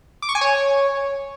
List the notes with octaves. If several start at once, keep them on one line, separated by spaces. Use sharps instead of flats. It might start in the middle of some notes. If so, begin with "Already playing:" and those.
D6
C#6
G#5
C#5